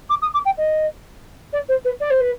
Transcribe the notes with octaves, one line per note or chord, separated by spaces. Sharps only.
D6
D#6
D6
G5
D#5
D5
C5
B4
D5
C5
B4